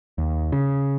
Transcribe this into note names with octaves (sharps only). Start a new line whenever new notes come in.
D#2
C#3